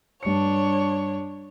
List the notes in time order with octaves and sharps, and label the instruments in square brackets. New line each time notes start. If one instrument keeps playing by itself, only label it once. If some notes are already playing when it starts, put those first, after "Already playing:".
[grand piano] G2 C#7 [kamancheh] D4 C#5